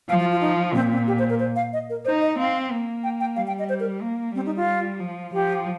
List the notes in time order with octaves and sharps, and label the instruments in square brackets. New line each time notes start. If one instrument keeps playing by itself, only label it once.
[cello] F3 [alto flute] F5
[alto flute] F4
F4
D#4
[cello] A#2 [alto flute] C4
[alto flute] C4
G4
C5
A#4
C5
F5
D#5
A#4
[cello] D#4 [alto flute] C5
[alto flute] D#5
[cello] C4 [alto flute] F5
[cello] A#3
[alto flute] G5
G5
[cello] G3 [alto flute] F5
[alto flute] G5
D#5
C5
A#4
[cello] A#3
[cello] G3 [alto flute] C4
[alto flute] D#4
F4
[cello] F3
[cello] F3 [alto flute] G4